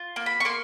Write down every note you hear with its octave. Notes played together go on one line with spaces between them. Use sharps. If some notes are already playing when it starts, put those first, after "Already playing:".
Already playing: F4
A#3
B5
C#6
A#3 C6